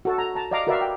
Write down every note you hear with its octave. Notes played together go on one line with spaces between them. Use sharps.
F#4 A4 A5
A#5
A5 A#5
D5 D#5 F5 A#5 D6
F#4 A#4 B4 D5 E5 F5
G5